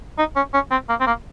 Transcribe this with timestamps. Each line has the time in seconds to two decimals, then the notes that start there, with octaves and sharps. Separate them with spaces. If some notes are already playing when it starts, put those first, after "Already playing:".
0.18 D#4
0.36 C#4
0.54 C#4
0.71 C4
0.89 A#3
1.01 C4
1.07 A#3